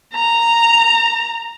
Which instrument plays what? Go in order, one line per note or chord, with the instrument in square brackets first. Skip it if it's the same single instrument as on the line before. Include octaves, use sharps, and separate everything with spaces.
[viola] A#5